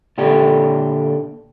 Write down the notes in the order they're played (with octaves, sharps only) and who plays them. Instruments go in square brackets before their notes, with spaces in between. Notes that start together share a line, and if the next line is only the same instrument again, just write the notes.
[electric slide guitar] A#2 D3 G4 A4